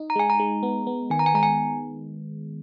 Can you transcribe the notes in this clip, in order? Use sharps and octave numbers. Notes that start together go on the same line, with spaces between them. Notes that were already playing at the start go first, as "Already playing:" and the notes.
Already playing: D#4
A#5
G#3 G#5
A#5
G#3
B3
B3
D#3 G#5
A#5
G#5
G#3 A#5
G#5